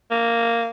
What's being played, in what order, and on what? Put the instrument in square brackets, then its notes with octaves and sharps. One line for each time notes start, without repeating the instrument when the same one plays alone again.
[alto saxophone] A#3